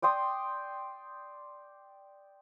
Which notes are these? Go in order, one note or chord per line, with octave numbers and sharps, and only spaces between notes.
D5 G5 C6 D#6